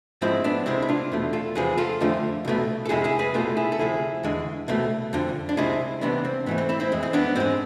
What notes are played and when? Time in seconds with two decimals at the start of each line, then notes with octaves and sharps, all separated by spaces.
0.21 G#2 F3 G#3 C4 E4
0.44 B3 D4
0.66 C2 C3 G#3 C4 E4
0.82 E4
0.89 D4 F4
1.11 E2 B2 A3
1.33 F4 A4
1.55 E2 C3 F3 G#4 B4
1.78 F4 A4
2.01 F2 D3 F3 A3
2.45 C2 B2 A3
2.85 A4
2.89 F2 C3 G#3 E4 G#4
3.04 E4 G#4
3.19 G#4 B4
3.34 C2 B2 A3 F4 A4
3.57 E4 G#4
3.72 A4
3.79 D2 C3 F3 E4 G#4
4.23 E2 D3 G#3
4.68 C2 B2 A3
5.13 F2 D3 F3
5.49 D4
5.57 C2 C3 G#3 C4 E4
6.01 C2 C3 E3 B3 D4
6.25 C4
6.46 G#2 E3 A3 B3
6.58 C4
6.69 C4 E4
6.80 C4 E4
6.92 F2 E3 G#3
7.03 C4
7.13 B3 D4
7.36 G#2 G#3 C4